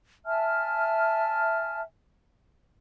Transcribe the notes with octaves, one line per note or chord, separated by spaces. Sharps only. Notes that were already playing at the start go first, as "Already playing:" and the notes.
E5 G#5 A5 F6